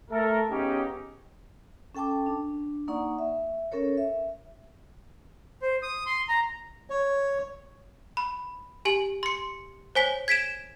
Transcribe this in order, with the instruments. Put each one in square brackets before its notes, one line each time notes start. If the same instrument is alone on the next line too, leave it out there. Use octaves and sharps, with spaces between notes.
[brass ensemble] A3 A4 A#4
C#3 B3 C#4 D#4 G4
[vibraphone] C#4 A4 G5 A5 D6
D4
A#3 D#4 D5 F#5 C#6
E5
C#4 A4 A#4 C#5
E5
[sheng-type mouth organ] C5
D#6
C6
A#5
[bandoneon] C#5
[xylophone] B5
G4 G#5 F#7
C6 C#7
C5 C#5 G#5 B6 G7
G#6 B6 D7 E7